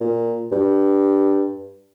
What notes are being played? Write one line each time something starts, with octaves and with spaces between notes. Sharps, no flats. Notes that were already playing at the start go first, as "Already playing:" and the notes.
A#2
G2